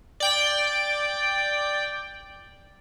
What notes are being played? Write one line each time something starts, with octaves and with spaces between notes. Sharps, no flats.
D5 G5